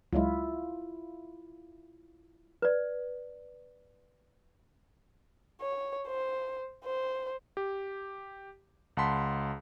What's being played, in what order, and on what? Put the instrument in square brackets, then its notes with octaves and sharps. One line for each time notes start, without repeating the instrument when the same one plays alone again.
[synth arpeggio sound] C#2 F#3 G#3 [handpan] E4 F4
[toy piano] B4 D5
[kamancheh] C#5
C5
C5
[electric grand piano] G4
C#2 F#5 A5 B5 C6 B6